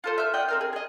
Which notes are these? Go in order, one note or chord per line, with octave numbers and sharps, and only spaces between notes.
F4 A4 C5
E5 F6
D5 D#5 F#5 G5
C4 A#4 F5
G#4
D#5 G#5